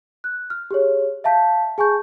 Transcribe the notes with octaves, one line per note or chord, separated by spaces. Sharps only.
F#6
F6
G4 G#4 C#5
E5 F5 A5 G6 B6
G#4 G#5 A5 C#6 G6